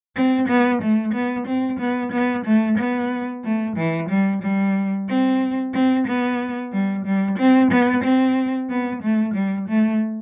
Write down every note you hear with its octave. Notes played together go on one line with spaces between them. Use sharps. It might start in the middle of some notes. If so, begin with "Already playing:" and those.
C4
B3
A3
B3
C4
B3
B3
A3
B3
A3
E3
G3
G3
C4
C4
B3
G3
G3
C4
B3
C4
B3
A3
G3
A3